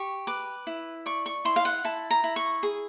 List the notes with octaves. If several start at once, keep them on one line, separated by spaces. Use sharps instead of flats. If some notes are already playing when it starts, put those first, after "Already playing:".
Already playing: G4 C#6
B4 D6
E4
D5 C#6
C#6
E4 C6
F5
F#5
E4 A5
A#5
E4
C#6
G#4